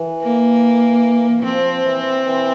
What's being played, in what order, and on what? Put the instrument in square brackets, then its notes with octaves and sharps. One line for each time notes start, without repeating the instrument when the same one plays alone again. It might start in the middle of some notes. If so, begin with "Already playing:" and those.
Already playing: [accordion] E3
[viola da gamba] A#3
[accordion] F3 [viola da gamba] C4
[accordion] E3
E3